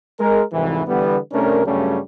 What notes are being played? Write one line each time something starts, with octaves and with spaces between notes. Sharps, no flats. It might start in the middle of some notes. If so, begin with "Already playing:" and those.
G#3 A#4
C2 F2 G#2 E3
D3 E3 G3 B3
C2 A3 C#4 D4 A#4
G2 C#3 F#3 G3 A3 C#4